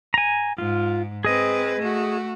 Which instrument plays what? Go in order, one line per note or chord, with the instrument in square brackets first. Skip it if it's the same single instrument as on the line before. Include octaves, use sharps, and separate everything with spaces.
[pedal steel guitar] G#5 A#5
[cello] G#2 [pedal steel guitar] F4
[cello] C4 B4 [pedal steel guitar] G#4 D#5
[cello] A3 F#4